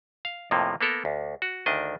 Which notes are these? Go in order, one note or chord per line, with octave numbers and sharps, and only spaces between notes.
F5
F2 A2 C3 F3 A#3
A#3 B3 A4 A#4
D2
F#4
D2 D#3 D4 D#5